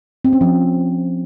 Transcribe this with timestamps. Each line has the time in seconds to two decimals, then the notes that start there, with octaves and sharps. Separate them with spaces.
0.25 C4
0.33 C#4
0.41 F3